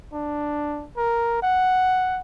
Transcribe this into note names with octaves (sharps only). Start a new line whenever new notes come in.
D4
A#4
F#5